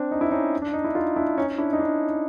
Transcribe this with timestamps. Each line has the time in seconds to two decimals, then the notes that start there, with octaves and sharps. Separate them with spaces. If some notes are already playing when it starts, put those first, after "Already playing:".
Already playing: C4 D4
0.11 D#4
0.21 E4
0.31 C#4 D#4
0.62 D4
0.73 D#4
0.84 E4
0.95 D#4 F4
1.16 D4 E4
1.37 C#4 D#4
1.58 D4 E4
1.73 D#4
1.79 D4 E4